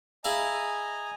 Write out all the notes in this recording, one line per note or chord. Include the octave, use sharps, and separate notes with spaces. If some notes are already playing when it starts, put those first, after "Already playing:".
E4 G#4 D#5 F5 G#5 A#5